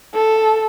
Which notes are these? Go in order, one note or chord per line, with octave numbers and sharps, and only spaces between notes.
A4